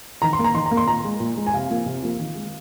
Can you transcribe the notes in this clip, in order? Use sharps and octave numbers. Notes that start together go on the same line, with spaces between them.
D#3 A#5
C6
A#3
A#5
D#3 C6
A#5
A#3
C6
A#2 A#5
G#3
A#2
G#3
G#5
C3 F5
F3 A#3
C3
F3 A#3
D#3
G#3